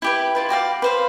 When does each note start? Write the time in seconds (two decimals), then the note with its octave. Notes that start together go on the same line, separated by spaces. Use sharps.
0.02 E4 G4 B4
0.35 E4 F4 B4
0.49 F#4 G4 D5 F5
0.82 B4 C5 F5